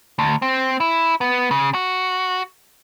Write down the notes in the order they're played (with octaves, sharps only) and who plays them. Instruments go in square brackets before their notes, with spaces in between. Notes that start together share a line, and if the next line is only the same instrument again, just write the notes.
[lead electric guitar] D2
C4
E4
B3
C#3
F#4